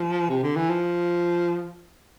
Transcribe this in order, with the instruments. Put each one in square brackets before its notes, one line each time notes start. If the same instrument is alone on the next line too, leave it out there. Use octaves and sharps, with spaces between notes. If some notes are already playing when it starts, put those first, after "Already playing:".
Already playing: [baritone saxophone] F3
C3
D3
E3
F3